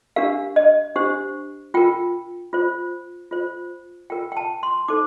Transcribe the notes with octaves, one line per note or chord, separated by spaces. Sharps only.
D4 G4 A#4 F5
D#5
D4 G4 C5
F4 A#4 G5
F4 C5
F4 C5
F4 A#4 G5
G5
A5
C6
D#4 A4 C5 D6